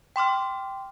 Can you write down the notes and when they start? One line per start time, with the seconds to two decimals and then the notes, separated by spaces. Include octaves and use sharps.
0.16 G5 C6 D6 F6